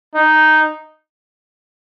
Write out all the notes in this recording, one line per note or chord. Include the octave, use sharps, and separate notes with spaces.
D#4